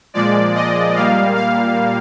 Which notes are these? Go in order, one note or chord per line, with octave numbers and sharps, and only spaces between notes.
A#2 F3 G#3 D5
D#5
A#2 G3 A#3 F5
F5